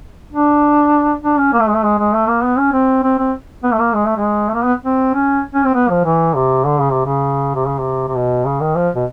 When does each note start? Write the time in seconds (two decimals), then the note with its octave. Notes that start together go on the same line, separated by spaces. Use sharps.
0.33 D4
1.23 D4
1.38 C#4
1.53 A#3
1.60 A3
1.67 G#3
1.74 A3
1.83 G#3
1.98 G#3
2.13 A3
2.28 A#3
2.44 B3
2.58 C#4
2.73 C4
3.03 C4
3.18 C4
3.64 B3
3.73 A3
3.79 A#3
3.94 G#3
4.06 A3
4.17 G#3
4.48 A3
4.54 A#3
4.64 B3
4.85 C4
5.14 C#4
5.54 C#4
5.64 C4
5.74 B3
5.90 F3
6.05 E3
6.35 C3
6.65 D3
6.80 C#3
6.93 C3
7.06 C#3
7.55 C3
7.67 C#3
7.80 C3
8.08 C3
8.16 B2
8.45 C#3
8.61 D#3
8.76 F3
8.95 B2